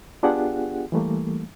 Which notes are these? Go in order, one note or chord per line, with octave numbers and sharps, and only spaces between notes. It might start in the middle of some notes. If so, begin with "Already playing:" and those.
B3 D4 F4 G4 G#4 F#5
E3 G3 A3 A#3